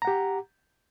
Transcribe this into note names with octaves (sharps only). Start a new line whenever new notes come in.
G4 F#5 A#5